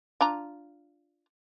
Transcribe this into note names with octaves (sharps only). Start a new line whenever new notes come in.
D4 F4 A#5